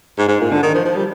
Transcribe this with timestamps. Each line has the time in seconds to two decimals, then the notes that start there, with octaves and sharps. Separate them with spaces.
0.18 G#2
0.29 G#2
0.41 A#2
0.51 D3
0.63 D#3
0.75 F3
0.85 F3
0.96 G3